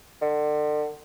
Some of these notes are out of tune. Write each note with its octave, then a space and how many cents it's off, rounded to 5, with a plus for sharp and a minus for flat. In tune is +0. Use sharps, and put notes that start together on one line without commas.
D3 +35